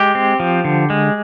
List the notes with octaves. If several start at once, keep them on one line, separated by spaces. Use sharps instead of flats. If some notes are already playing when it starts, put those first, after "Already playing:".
Already playing: G#3 G4
C4
F3
D3
G#3